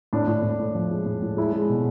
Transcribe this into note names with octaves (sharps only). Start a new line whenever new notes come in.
A2 D4
A2
A2
A2
F3
G#3
A2
A2
G#3 E4
G#3
B2